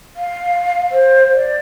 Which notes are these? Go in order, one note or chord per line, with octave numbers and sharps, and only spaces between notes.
F5
C5
D5